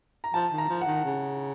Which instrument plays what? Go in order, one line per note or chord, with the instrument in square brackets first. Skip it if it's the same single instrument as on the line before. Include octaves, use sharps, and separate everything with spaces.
[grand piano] A#5
[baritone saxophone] F3 [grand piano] A5
[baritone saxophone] D#3
[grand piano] A#5
[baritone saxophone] F3
[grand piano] F#5
[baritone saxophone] D#3
C#3